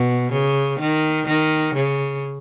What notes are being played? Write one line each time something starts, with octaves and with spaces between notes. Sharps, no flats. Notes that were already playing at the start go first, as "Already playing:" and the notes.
Already playing: B2
C#3
D#3
D#3
C#3